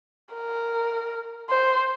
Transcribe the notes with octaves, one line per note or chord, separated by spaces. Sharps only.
A#4
C5